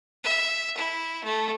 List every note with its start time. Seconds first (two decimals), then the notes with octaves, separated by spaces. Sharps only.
0.24 E5
0.77 E4
1.24 A3